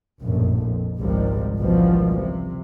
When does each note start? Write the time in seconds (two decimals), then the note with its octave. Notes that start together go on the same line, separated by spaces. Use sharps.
0.22 F1 A#1 F#2 A2
0.62 F2
0.99 G#1 C#2 G#2 C3 F3 G3
1.57 G#1 C#2 B2 E3 F3 G3
2.17 C3